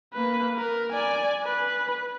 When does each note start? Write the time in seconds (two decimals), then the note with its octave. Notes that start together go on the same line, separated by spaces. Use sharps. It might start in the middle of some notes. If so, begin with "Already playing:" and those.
0.14 A#3 B4
0.57 A#4
0.92 D5 G#5
1.44 B4